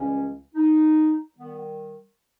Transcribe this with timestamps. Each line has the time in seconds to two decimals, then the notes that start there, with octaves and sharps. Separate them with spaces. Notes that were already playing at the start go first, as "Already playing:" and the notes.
Already playing: C#2 C#3 E3 G3 C#4
0.55 D#4
1.36 D#3 G3 B3